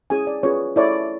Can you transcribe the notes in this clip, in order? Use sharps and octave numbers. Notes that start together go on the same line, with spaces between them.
C#4 E4 G#4 C#5 G#5
D5
C#4 F4 G#4 B4 C#5
E4 A4 C#5 D5